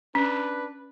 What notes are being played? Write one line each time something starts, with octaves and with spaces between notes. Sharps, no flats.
C#4 D4 B4